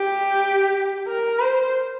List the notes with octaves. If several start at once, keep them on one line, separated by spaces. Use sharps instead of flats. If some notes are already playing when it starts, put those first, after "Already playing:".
Already playing: G4
A#4
C5